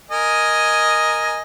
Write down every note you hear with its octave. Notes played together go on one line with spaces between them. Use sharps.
A#4 D#5 G#5